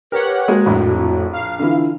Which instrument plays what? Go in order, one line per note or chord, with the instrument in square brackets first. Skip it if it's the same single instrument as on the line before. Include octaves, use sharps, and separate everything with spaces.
[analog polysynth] G4 C#5 F#5 [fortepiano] A#4 [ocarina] B4
[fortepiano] G#3 A#3 [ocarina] F#4
[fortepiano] A#1 [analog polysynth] F2 A2
[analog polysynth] F5
[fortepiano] D3 E3 [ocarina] F4